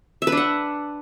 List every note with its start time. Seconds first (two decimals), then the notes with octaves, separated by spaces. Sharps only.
0.22 E5
0.27 B4
0.32 D4
0.37 F#5